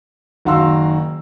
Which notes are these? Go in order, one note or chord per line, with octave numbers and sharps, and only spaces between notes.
F#1 D#3 F#4 F5 C6 E6